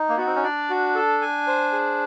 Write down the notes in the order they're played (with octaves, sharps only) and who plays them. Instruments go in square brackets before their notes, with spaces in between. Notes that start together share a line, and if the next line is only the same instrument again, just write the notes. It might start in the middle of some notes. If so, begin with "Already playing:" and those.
Already playing: [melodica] D#4
A#3
[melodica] B3 [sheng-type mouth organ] F#4
[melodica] C4
C#4
[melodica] D4 [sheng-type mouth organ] D5
[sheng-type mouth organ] F#4
A4
G#5
C5
G#4